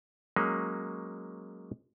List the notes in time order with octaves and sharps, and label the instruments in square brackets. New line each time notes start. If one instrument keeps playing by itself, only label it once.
[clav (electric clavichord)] F#3 G#3 A#3 C#4